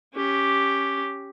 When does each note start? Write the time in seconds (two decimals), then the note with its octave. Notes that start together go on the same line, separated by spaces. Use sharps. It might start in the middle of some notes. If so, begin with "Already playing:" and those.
0.14 C#4 G4